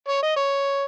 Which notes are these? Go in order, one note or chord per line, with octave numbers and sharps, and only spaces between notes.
C#5
D#5
C#5